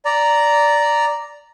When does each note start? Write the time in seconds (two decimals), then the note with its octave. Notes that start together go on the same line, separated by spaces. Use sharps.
0.05 D5 A#5